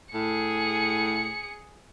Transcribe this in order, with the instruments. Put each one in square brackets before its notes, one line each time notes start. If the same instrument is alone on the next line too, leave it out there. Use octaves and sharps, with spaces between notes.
[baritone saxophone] A2 [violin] G#4 C#7